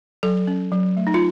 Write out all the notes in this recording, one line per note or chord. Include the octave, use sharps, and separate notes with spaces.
F#3 A4
C#4
F#3
A3
D#4
F4